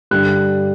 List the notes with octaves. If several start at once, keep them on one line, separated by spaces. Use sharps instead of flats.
G2 D3 G3 F#6